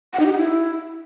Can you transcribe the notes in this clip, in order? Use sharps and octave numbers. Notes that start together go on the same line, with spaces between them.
F#5
D#4
G4
D#4
E4